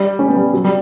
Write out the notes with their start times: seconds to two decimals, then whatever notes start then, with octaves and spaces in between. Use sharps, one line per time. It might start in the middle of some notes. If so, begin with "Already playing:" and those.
Already playing: G3
0.19 C#4
0.28 B3
0.36 G3
0.54 F#3
0.64 G3